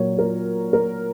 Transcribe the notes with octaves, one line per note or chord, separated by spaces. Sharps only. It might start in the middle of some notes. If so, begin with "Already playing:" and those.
Already playing: A#2 F#3 A#3 C#5
A#4
A#4